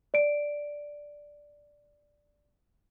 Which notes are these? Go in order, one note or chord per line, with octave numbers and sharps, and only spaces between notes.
D5 D7